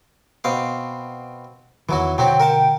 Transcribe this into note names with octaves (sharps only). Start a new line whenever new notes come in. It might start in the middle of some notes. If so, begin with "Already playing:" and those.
B2 C4 F5
E2 D#3 E3 F#3 F#4
B2 D3 F#3 C4 F#4 G5
A#4 F#5 A5